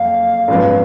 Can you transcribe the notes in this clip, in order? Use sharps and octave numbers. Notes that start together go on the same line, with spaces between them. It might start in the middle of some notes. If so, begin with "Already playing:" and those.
Already playing: F#1 F2 F5
G#1 F#2 F3 B3 F4